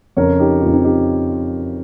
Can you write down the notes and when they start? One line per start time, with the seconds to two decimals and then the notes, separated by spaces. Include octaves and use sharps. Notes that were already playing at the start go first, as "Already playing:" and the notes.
0.17 F2 C#3 A#4 C#5
0.39 D#4 G4
0.61 F2 C#3 C#4 F4
0.73 C4 D#4
0.84 D#4 G4